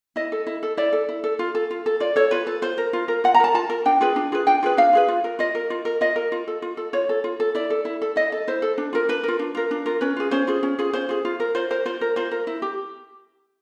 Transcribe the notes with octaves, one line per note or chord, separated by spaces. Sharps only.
E4 D#5
A4
E4
A4
E4 D5
A4
E4
A4
F4
A4
F4
A4
F4 D5
A4 C#5
F4 B4
A4
F4 C5
A#4
F4
A#4
F4 F#5
A#5
A#4 A5
F4 A5
A#4
D4 G5
F4 G#4 B4
D4
F4 G#4 B4
D4 G5
F4 G#4 B4
D4 F5
F4 G#4 B4
F4
A#4
F4 D#5
A#4
F4
A#4
F4 D#5
A#4
F4
A4
F4
A4
F4 C#5
A4
F4
A4
E4 D5
A4
E4
A4
E4 D#5
A4
E4 C5
A4
D4
F4 A#4
D4 B4
F4 A#4
D4
F4 A#4
D4
F4 A#4
C#4 B4
F4 G#4
C#4 C5
F4 G#4
C#4
F4 G#4
C#4 C5
F4 G#4
F4
A#4
F4 C5
A#4 C5
F4 C5
A#4
F4 C5
A#4
E4
G4